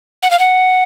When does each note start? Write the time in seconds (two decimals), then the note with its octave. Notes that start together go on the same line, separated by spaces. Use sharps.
0.23 F#5
0.31 F5
0.39 F#5